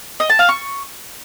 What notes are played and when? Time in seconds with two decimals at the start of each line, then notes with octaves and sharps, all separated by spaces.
0.20 D#5
0.30 A5
0.39 F5
0.49 C#6